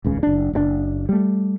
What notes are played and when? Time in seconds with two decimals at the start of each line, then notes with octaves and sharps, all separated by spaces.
0.04 D#1 C#2 C#3
0.23 F#1 D4
0.53 F#1 B2 D4
1.09 G3 A3